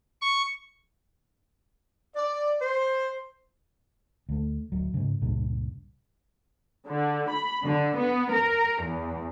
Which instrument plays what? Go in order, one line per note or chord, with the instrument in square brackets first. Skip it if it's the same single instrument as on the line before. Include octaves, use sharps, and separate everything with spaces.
[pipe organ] C#6
[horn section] D5
C5
[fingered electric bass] D2 A3
D1 F#3
G#2 C#3
C#2 G2 A#2
[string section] D3
B5
D3
B3
A#4
E2